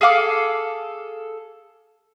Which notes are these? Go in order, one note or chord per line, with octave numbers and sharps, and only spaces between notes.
G#4 A4 F5 D6